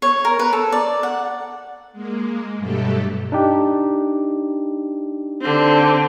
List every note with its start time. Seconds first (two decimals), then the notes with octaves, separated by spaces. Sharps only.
0.02 C#5
0.25 A#4
0.39 B4
0.53 A4
0.72 D5
1.03 F#5
1.92 G#3 A#3
2.57 G2 B2 F#3 A3 G4 A4
3.32 D4 D#4 G4
5.41 D3 C4